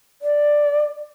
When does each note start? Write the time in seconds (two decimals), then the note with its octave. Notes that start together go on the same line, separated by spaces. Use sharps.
0.22 D5